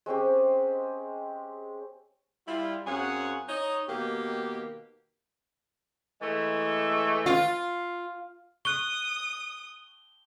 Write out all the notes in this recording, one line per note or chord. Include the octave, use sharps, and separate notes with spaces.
G#3 C4 C#4 G4
G3 E4 F4
F#2 C4 F4 G#4 C#5 F#5
D#4 C#5 D#5
B2 D#3 A#3 G4
E3 G#3 A3
F4
C#6 D#6 F#6 G7